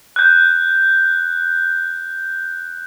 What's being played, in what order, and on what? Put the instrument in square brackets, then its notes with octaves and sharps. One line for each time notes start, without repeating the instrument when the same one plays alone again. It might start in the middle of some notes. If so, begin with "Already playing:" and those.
[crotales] F#6 G6